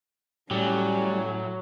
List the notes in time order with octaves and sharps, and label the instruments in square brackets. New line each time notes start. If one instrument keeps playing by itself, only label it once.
[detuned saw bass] A2 [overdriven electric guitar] F#3 [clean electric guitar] G3 G4 [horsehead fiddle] C#4 G#5